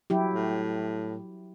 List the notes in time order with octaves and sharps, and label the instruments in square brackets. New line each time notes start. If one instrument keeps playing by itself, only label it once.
[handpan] F#3 E4 G4
[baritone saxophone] A2